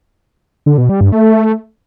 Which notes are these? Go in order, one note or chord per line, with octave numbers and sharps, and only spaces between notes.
D3
B2
G3
G2
A3